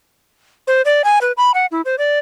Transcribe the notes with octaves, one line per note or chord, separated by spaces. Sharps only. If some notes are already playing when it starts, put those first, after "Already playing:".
C5
D5
G#5
B4
B5
F#5
E4
C5
D5